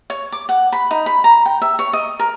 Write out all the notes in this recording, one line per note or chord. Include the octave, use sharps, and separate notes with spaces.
C#5
D6
F#5
B5
D#4
B5
A#5
G5
E5
C#5
D#5
A#4